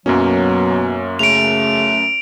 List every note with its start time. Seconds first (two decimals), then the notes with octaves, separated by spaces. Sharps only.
0.06 F#2 B2 F#3 A#3 C#4
1.19 C#3 A3 D7 F7